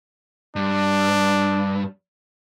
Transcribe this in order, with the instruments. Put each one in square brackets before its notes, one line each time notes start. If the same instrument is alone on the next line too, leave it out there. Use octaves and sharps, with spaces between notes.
[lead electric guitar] G2 [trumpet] D4